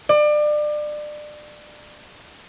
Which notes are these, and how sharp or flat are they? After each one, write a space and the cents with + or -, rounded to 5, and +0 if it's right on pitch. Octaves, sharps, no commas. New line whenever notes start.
D5 +30